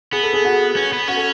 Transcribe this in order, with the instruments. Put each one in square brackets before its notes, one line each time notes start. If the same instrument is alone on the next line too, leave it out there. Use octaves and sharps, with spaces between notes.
[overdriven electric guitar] B3 [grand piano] G#4
[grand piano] A4
G#4
F#4
[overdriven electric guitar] C#4
B3
[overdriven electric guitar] C#4 [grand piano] F#4
[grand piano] A4